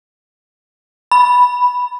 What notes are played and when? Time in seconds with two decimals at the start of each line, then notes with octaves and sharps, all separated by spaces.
1.12 B5